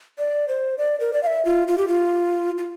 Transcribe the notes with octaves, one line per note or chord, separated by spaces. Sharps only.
D5
C5
D5
A#4
D5
F5
E5
F4
F4
G4
F4
F4